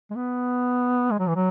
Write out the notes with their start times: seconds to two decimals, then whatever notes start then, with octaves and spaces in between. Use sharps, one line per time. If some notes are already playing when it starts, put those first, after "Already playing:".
0.10 G#3
0.16 B3
1.11 G#3
1.19 F#3
1.27 E3
1.36 F#3